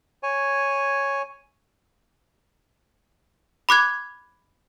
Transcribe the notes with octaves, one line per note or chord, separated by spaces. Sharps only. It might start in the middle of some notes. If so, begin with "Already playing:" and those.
C#5 G#5
B5 D6 F#6 G#6